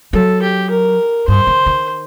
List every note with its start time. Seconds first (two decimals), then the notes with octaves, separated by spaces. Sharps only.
0.13 F#3 A4
0.42 G4
0.70 A#4
1.28 G2 C5
1.47 D#3
1.66 D#3